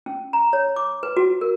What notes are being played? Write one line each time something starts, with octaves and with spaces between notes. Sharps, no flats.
C#4
A#5
C#5
D6
B4
F#4
A#4